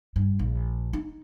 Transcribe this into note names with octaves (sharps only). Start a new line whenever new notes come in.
G2
A#1
D#4